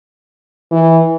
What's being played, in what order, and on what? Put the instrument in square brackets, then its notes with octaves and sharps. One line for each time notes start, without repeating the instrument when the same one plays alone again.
[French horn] E3